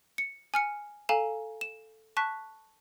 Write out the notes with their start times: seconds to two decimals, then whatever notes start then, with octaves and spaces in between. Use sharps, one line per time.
0.18 C#7
0.54 G#5 F6 C#7
1.09 A4 F5 G#5 A#5 E7
1.61 E7
2.17 A5 C#6 F#6 B6